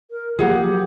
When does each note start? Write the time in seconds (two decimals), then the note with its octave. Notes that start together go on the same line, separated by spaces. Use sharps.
0.11 A#4
0.39 F3 F#3 A#3 G4 G#4 F#5